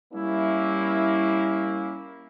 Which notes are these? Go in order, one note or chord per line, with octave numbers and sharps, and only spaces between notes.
G3 A#3 C#4 E4